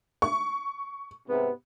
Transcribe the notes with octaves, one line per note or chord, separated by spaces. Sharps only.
C#6
G#2 C3 B3